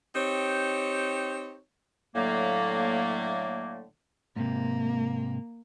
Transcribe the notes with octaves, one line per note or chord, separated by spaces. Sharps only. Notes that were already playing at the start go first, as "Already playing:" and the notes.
C4 D#4 G4 C#5
A2 D3 F#3 A3 A#3
G#2 C3 A#3